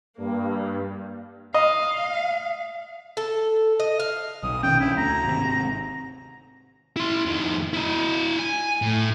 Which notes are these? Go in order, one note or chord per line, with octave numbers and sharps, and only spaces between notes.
G2 A#3
D#5 F5
A4
D#5
F5
B1 D#6
B2 D#3 C#4 G5
B1 C#4 D4 E4
D2 A#5
G#1 C3
E4 C6
F2 D#3
E4 D#5
G#5
A2